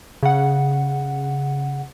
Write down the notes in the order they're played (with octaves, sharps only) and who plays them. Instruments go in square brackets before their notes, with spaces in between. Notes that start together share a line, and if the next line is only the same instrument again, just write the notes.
[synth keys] C#3 F#5